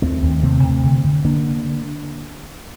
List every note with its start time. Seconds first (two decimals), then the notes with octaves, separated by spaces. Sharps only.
0.02 D#2 A3 C4
0.22 D#2
0.43 C3 A3 C4
0.64 C3
0.84 D3
1.04 D3
1.24 D3 A#3 D4